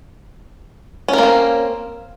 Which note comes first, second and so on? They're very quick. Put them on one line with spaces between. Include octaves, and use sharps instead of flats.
C#4 A#4 A#3 C4